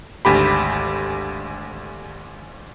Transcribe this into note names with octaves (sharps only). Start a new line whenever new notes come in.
G#1 D2 G4 B5